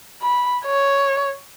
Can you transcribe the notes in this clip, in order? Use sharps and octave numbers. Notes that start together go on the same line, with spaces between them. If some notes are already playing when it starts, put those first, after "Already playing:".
B5
C#5